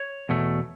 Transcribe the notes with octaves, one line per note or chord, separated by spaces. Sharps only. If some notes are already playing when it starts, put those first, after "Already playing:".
Already playing: C#5
E2 B2 A3